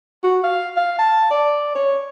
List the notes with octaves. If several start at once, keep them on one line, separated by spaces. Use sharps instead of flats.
F#4
F5
F5
A5
D5
C#5